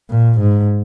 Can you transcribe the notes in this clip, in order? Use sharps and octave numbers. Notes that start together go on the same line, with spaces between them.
A#2
G#2